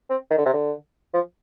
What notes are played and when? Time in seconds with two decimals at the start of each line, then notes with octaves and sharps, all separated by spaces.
0.10 C4
0.30 D#3
0.38 D3
0.46 C3
0.53 D3
1.13 F3